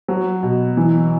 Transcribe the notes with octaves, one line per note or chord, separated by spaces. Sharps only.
F#3
B2
E3